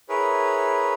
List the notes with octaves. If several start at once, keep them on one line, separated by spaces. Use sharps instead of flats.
E4 G#4 A#4 B4 C#5